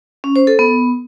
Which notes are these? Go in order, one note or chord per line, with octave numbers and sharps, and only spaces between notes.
C#4
C5
A4
B3